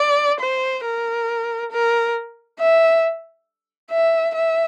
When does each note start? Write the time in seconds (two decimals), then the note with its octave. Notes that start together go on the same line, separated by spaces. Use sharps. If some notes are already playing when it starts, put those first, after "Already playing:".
Already playing: D5
0.40 C5
0.84 A#4
1.71 A#4
2.60 E5
3.91 E5
4.35 E5